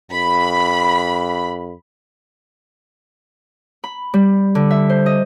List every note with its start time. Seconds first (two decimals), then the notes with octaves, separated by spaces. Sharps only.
0.11 F2 B5
3.84 B5
4.14 G3
4.55 D3
4.71 E5
4.90 C5
5.06 D#5